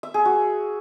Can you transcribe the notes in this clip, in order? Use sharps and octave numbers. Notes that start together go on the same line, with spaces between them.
E5
G#4
F#4